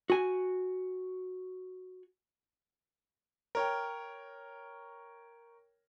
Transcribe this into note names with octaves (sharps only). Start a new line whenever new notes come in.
F#4 G#5
A#4 C#5 G5